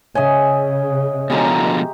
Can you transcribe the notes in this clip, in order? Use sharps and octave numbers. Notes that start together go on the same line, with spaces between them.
C#3 C#5 D#5 E5 G#5
B2 D3 F3 G#3 G4 A#5